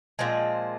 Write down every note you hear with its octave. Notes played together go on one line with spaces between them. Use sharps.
A#2 F3 G#3 C4